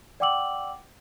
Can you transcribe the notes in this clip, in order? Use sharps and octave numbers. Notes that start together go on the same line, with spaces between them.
D5 F#5 G5 D6 E6 F#7